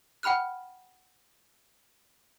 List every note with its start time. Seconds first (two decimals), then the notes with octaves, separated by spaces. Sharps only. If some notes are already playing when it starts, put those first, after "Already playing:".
0.23 F#5 G5 B5 F6 F#6